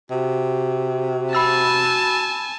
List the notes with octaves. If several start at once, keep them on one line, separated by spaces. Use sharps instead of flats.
C3 F#4
G#5 A5 B5 E6 A6